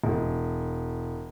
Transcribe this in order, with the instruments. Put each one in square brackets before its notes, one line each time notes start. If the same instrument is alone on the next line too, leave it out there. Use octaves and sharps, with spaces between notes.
[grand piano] E1